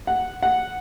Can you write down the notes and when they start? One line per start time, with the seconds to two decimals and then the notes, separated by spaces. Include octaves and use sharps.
0.07 F#5
0.43 F#5